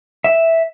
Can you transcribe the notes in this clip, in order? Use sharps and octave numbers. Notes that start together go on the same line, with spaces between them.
E5